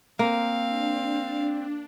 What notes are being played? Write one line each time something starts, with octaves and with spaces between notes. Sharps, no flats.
A#3 C4 F5
D4